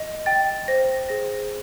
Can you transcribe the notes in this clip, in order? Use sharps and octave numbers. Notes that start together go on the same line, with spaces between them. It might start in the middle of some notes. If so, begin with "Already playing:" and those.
Already playing: D#5
G5 A6
C5 A#6
G#4 A#6